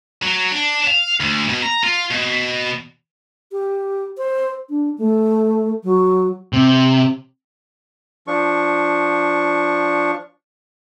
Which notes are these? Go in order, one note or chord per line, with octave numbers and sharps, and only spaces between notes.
F#3
D4
F5
D2
B2
A#5
F4
B2
G4
C5
D4
A3
F#3
C3
F3 D4 C#6